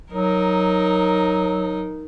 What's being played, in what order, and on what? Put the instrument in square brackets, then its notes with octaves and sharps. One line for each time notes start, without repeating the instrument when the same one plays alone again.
[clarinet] F#3 [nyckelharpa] D#4 A#4